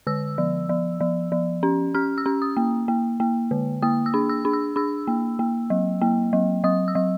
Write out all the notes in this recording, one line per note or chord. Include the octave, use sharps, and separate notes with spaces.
D3 E6
F3
F3
F3
F3
C#4
C#4 F6
E6
C#4
D#6
A#3
A#3
A#3
D3
A#3 D#6
E6
D4
E6
D4
E6
D4 E6
A#3
A#3
F#3
A#3
F#3
F#3 D#6
E6
F#3